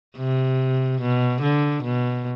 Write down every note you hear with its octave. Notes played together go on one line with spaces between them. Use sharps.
C3
B2
D3
B2